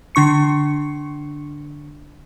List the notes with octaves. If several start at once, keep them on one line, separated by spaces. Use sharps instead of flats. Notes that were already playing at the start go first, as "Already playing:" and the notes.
D3 D4 C#6 C#7